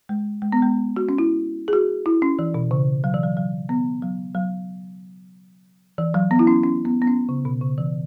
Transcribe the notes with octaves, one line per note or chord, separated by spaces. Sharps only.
G#3
G#3
B3
G#3
F#4
C#4
E4
G#4
F#4
E4
C#4
E3
B2
C#3
F#3
E3
F#3
F#3
B3
F#3
F#3
E3
F#3
B3
E4
C#4
C#4
B3
B3
C#4
C#3
B2
C#3
E3